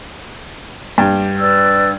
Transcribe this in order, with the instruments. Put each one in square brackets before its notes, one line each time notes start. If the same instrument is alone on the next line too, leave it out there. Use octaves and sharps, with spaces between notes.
[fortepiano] G2 G5
[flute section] B4 D5 E6